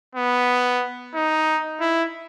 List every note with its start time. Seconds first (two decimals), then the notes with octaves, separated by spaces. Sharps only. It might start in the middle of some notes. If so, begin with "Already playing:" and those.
0.15 B3
1.15 D#4
1.81 E4